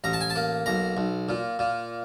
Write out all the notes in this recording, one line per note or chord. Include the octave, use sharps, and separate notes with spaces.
A1 A#5
A5
G#5
A5
A#3
B1 A#5
B1
A#2
A#2